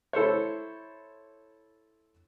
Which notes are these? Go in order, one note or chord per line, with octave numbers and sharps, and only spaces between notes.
E4 A4 C5 C#5